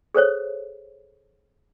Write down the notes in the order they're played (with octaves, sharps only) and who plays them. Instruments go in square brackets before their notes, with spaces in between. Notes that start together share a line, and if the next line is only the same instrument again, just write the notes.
[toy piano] G#4 A4 C5 C#5